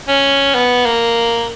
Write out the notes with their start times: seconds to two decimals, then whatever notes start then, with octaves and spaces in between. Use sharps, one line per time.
0.08 C#4
0.55 B3
0.86 A#3